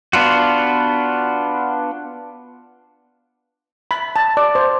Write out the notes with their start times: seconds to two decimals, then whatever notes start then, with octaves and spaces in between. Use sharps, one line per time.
0.13 B3 D4 F4 F#4
3.91 B5
4.16 A5
4.37 D5
4.55 C5